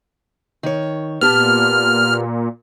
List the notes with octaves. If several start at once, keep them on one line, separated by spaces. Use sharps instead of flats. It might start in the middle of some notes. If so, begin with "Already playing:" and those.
D#3 C#5
A#2 B3 G4 A5 F6